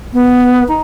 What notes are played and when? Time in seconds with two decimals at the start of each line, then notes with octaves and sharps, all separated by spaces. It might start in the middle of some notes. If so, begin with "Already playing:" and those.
0.13 B3
0.68 D#4